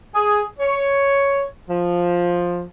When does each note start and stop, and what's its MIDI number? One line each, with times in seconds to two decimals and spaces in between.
0.14 0.42 68
0.59 1.43 73
1.69 2.63 53